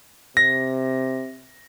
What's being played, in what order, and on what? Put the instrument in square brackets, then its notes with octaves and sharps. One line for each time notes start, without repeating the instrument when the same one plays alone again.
[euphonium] C3 [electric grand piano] A#6